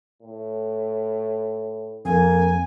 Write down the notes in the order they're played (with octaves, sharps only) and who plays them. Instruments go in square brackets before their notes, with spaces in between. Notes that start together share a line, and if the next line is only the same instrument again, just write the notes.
[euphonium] A2
[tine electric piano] F2 [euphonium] A#3 [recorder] G#5